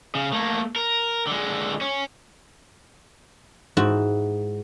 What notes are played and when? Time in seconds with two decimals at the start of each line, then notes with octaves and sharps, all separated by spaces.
0.15 C#3
0.33 A3 A#3
0.76 A#4
1.27 D3 G#3
1.81 C#4
3.77 G#2 E4 F#4